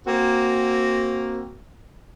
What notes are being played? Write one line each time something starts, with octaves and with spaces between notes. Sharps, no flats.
A#3 C4 F#4